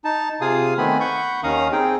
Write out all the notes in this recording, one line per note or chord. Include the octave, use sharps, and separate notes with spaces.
D#4 A5
C3 F4 G#4 F5 G#5 D#6
D#3 A3 B3 C4 G#5 B5
F#5 B5 C#6 G6
D#2 D#3 C#4 F5 A#5 D#6
C4 D#4 G#4 G5